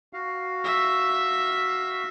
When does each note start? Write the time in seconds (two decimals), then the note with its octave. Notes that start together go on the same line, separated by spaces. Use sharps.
0.13 F#4 F5
0.64 E5